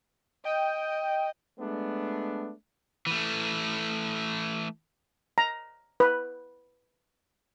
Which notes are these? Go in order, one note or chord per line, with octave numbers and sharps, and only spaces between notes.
D#5 G5
G#3 A3 B3 D4
E3 A3
A#5
B4